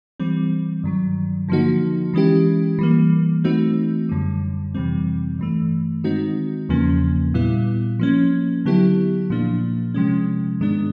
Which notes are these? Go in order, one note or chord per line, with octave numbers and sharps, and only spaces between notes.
E3 G3 C4
G2 D#3 F#3
D3 F3 A#3 D#4 F#4
E3 G#3 C#4 E4 G4
E3 G3 A#3
E3 A3 C4 D#4 F#4
F#2 D3 G3
F2 C3 E3 G3 C4
G2 E3 A3
D#3 G#3 C4 D#4 F#4
E2 C#3 F3 A#3 C#4
A#2 G3 B3 E4
F3 A#3 C#4
D3 F#3 B3 E4 G4
A#2 F3 A#3 D4
C3 F3 G#3 C#4
G#2 D#3 G#3 B3 D4